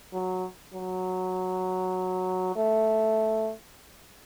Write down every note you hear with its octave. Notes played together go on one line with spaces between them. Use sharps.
F#3
F#3
A3